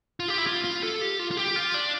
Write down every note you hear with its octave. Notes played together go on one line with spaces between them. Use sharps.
F4
G4
E4
F4
F4
A4
G4
F4
F4
G4
F4
D4